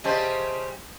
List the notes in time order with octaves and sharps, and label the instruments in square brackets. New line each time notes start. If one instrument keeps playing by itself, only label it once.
[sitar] C#3 G3 C5 [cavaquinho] D#5 E5 A5